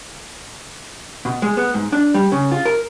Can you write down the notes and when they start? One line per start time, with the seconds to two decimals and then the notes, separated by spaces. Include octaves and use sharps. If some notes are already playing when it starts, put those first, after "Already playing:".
1.25 B2
1.42 G#3
1.57 B3
1.74 G#2
1.92 D4
2.14 G3
2.32 C#3
2.52 F4
2.65 A#4